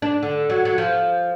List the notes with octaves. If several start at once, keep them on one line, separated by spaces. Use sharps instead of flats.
D4
D3
F#3
F#3
F3